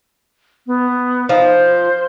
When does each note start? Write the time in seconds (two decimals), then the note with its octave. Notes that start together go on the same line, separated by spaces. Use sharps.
0.67 B3
1.29 F3 D#4
1.43 C5